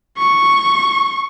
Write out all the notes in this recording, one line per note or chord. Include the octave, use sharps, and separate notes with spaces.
C#6